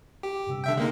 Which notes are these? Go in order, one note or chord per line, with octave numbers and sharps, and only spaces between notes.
G4
G2 C3 E6
D3 E5 G5
G#3 A#3 D#4